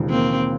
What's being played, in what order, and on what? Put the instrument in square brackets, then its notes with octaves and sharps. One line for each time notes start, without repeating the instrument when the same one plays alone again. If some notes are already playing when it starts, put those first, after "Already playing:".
Already playing: [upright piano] E1 D#2 C#3 F3 G#3
[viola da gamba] A#3 C4